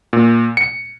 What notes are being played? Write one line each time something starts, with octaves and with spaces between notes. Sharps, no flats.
A#2
C#7